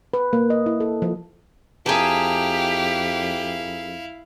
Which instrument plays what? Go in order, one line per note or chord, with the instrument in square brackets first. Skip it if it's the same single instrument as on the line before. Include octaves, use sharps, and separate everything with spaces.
[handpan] B4
A#3
D#5
E4
A4
F3
[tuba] F2 [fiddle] E4 F5 [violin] G4 [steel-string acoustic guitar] G#4 A#4 A5